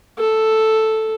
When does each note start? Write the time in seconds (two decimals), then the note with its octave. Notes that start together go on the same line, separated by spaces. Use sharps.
0.18 A4